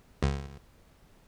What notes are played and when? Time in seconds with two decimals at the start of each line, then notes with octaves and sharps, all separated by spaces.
0.23 C#2